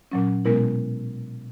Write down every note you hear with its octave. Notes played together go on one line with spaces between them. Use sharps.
A#2 F#3 C#4
B2 G#3 B3 E4 A#4